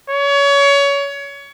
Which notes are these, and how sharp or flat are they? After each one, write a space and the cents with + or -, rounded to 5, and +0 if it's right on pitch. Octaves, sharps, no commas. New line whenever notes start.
C#5 +25